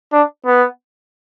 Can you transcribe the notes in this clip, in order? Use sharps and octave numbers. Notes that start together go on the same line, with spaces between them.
D4
B3